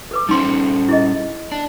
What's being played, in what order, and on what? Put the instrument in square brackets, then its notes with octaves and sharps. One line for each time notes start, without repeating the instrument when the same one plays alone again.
[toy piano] A4 B4 D6
[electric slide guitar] G3 C#4 C5 [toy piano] D#4 C6
[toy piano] E4 G#4 D#5
[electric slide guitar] D4